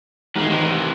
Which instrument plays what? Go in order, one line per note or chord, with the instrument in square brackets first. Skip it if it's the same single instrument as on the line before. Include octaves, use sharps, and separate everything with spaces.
[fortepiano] A1 D#3 [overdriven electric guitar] E2 G#3
[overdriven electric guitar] C3 E3